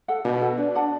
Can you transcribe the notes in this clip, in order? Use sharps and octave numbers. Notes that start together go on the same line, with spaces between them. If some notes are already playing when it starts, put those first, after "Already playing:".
A4 F#5
B2 D4
A4 F#5
D4 B4
D5 F#5 A5